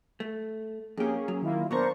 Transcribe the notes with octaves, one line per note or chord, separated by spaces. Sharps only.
A3
F2 A#3 C#4 G4 G#4
F#3
D#3 A#3 E4 F4
A#2 B3 D4 A#4 C5 A#5 C#6